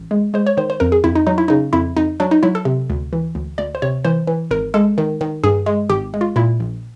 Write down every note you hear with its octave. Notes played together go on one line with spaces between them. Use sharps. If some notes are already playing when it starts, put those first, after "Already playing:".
Already playing: A1
G#3
G#3 C5
C#5
D#3 C5
C5
F2 A#4
G#4
F2 E4
D#4
F#3 D#4
E4
C#3 D#4
F2 E4
F2 D#4
F#3 D4
D#4
F#3 E4
A4
C3
D2
E3
D2
D2 D5
C5
C3 C#5
E3 C5
E3
G#1 A#4
G#3 A4
D#3
D#3
G2 G#4
G#3
G#1 G4
G#3
F4
A#2 E4
A#1